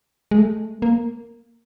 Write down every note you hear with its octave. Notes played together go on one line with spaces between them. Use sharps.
G#3
A3
A#3